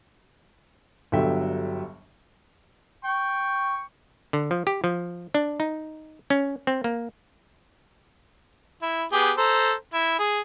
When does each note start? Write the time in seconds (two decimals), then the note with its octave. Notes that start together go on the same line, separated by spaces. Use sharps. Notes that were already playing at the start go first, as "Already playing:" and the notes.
1.12 G1 D3 F#3 G3 E5 G5
3.04 G5 C#6
4.33 D3
4.51 F3
4.67 G4
4.84 F3
5.34 D4
5.60 D#4
6.30 C#4
6.67 C4
6.84 A#3
8.83 E4
9.12 B3 G4 G#4
9.37 A4 C5 A#5
9.94 E4
10.19 G#4